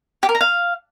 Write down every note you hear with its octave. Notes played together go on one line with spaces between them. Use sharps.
G4
A#4
A#5
F5